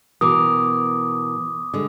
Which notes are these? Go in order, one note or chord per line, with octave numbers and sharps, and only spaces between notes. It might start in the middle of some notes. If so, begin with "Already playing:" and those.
B2 E3 A#4 D6 D#6
D3 G#3